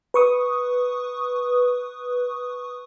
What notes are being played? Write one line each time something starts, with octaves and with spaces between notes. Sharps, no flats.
B4 C#6 D#6